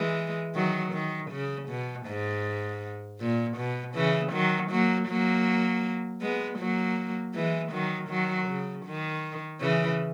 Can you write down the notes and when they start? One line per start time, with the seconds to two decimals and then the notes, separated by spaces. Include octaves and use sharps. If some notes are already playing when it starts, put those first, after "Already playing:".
Already playing: E3 G#3
0.55 D#3 F#3
0.93 D#3
1.31 C#3
1.69 B2
2.06 G#2
3.20 A#2
3.57 B2
3.95 C#3 E3
4.33 D#3 F#3
4.71 F#3 A#3
5.08 F#3 A#3
6.21 G#3 B3
6.59 F#3 A#3
7.35 E3 G#3
7.72 D#3 F#3
8.10 D#3 F#3
8.48 C#3
8.85 D#3
9.60 C#3 E3